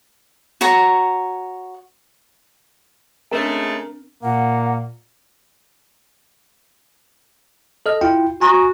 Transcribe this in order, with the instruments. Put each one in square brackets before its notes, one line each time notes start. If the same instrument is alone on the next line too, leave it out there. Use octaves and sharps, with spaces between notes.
[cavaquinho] F#4 C#5 A#5
[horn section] C#3 G#3 A3 [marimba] C4 D4 [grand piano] A#4
[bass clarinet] A#2 [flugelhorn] A#3 [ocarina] F#5
[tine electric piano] A4 D#5 F6
E4 F4 G5
[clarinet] F#4 [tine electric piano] G#5 A#5 D#6